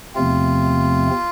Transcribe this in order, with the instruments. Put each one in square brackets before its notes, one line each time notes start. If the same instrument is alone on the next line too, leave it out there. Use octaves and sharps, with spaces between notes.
[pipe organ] E2 C3 F3 A3 C4 [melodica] F4